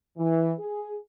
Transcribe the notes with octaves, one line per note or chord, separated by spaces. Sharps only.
E3
G#4